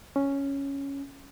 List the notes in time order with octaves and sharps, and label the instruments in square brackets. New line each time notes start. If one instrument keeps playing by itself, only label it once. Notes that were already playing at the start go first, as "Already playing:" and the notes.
[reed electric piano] C#4